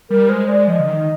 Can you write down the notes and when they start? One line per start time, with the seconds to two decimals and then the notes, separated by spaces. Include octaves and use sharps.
0.10 G3 A#4
0.29 G#3 C5
0.48 G#3 D5
0.67 F3 D#5
0.79 D3
0.88 D#3